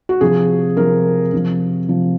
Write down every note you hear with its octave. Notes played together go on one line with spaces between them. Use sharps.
F#4
C3 F3 G#4
C3 F3 A#4
C3 F3
C3 F3